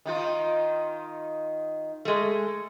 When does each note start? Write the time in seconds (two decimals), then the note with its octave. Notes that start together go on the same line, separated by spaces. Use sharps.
0.06 D#3 D#4 F4
2.05 G#3 A3